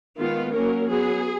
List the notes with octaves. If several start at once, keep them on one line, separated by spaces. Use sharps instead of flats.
D#3 G#3 B3 F4
F#3 A#3 C#4 A#4
F#3 B3 G#4